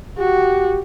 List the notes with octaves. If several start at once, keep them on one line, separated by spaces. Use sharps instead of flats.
F#4 G4